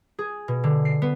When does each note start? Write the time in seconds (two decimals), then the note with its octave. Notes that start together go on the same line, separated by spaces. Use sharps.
0.19 G#4
0.48 B2
0.64 D3
0.85 C7
1.02 B3